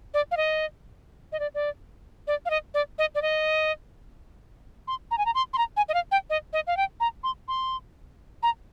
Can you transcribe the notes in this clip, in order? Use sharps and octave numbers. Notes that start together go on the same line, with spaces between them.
D5
F5
D#5
D#5
D5
D5
D5
F5
D#5
D5
D#5
D5
D#5
C6
A#5
G#5
A#5
C6
C6
A#5
G#5
D#5
F5
G5
D#5
D#5
F5
G5
A#5
C6
C6
A#5